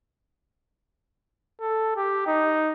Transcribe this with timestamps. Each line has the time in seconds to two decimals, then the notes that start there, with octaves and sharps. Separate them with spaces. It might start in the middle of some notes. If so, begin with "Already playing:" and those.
1.60 A4
1.96 G4
2.27 D#4